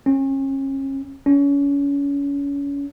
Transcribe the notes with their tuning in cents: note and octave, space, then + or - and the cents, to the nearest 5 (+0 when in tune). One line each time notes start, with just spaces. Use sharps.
C#4 -35
C#4 +30